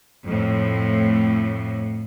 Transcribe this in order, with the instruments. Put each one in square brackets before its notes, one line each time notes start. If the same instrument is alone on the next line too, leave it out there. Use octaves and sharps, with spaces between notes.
[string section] F2 A2